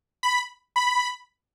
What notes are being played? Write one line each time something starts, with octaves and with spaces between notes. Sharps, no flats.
B5
B5